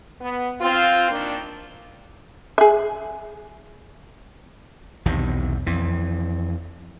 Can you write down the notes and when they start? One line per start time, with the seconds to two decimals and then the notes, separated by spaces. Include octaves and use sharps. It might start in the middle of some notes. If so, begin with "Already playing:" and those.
0.21 B3
0.61 C4 F4
1.11 D#3 A#3 D4
2.58 G#4 E5
5.06 B1 E2 C3 D#3
5.66 F2 E3